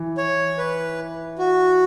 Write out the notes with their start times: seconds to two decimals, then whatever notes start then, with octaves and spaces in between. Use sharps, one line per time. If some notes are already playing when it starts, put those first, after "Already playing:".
Already playing: E3
0.17 C#5
0.58 B4
1.38 F#4